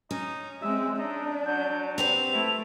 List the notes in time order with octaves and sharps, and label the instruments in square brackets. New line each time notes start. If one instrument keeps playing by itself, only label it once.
[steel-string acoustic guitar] C#4 [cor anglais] D#4
[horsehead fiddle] G#3 C4 [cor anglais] E5
[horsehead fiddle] D4 [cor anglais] D#4
[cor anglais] F#3 [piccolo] G6
[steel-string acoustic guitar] C4 G4 B4 [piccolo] F7
[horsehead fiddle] A3 [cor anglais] E4